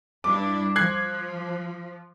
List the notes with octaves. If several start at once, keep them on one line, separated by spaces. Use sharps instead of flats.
G2 D4 E4 D6
F3 F#6 G#6 C7